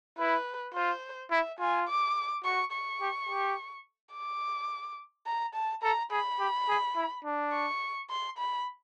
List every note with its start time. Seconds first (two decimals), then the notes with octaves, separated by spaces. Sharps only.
0.18 E4 B4
0.74 F4 C5
1.31 E4 E5
1.59 F4 G#5
1.88 D6
2.45 F#4 C#6
2.72 C#6
3.01 G4
3.29 G4
4.13 D6
5.26 A#5
5.55 A5
5.83 A4 A#5
6.11 G#4 B5
6.39 G4
6.69 G#4
6.96 E4
7.25 D4
7.52 C#6
8.10 C6
8.38 B5